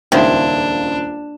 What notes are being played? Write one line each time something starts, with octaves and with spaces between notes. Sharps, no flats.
D#1 C#2 D#3 D4 E4 C5